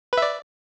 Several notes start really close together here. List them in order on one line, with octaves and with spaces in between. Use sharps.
B4 E5 D5